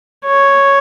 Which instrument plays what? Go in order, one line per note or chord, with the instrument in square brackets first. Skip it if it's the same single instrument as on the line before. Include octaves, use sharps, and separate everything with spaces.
[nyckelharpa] C#5